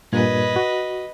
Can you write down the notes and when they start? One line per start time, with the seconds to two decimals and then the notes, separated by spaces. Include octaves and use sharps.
0.12 G2 A#2 B4 D#5 G#6
0.56 F#4